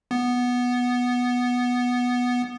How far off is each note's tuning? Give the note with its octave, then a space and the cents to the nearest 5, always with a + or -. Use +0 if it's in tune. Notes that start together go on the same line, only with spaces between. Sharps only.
B3 -5